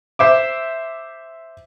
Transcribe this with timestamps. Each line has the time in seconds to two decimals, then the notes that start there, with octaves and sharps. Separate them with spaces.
0.19 C5 E5 D6